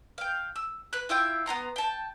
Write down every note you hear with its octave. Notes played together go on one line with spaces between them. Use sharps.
F5 G5
E6
B4 F#6
E4 F4 E5 G5
B3 E4 A#5 C6
G5 A5